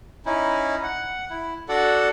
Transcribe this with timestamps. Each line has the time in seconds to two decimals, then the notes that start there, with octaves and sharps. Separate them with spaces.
0.26 C#4 D#4 E4
0.83 F#5
1.30 E4
1.69 D4 F#4 A4 D5 F#5